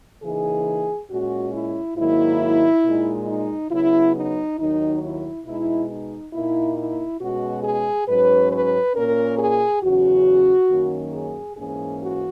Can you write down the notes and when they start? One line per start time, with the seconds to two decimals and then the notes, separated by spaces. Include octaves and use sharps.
0.22 C#3 E3 A#3 D#4 G#4
1.10 A#2 G#3 C#4 F#4
1.54 E4
1.97 G#2 D#3 F#3 A#3 E4
2.84 A#2 G#3 D#4
3.28 D#4
3.72 C#3 F#3 B3 E4
4.16 D#4
4.59 D#2 D#3 F#3 D#4
5.03 E4
5.46 B2 G#3 D#4 E4
5.90 D#4
6.33 A#2 A#3 D#4 E4
6.77 E4
7.21 B2 G#3 C#4 F#4
7.64 G#4
8.08 G#2 F#3 C#4 B4
8.51 B4
8.95 A#2 A#3 C#4 A#4
9.39 G#4
9.83 E2 C#3 F#3 C#4 F#4
10.70 F#2 D#3 A#3 C#4
11.13 G#4
11.57 G#2 E3 A#3 C#4 G#4
12.01 F#4